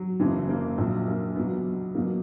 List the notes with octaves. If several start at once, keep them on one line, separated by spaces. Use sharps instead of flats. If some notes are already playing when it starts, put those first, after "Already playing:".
Already playing: F#3
F#1 F#2 C#3 E3
A#3
A#1 A#2 F#3
A#3
E2 B2 F#3 B3
E2 B2 F#3 A#3